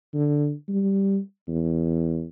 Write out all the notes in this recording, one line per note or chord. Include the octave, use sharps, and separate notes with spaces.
D3
G3
E2